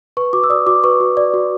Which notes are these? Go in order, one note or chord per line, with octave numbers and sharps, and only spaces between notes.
B4 C#6
F#4 D6
E6
D5 D#6
F#4 D6
B4 C#6
F#4
D5
F#4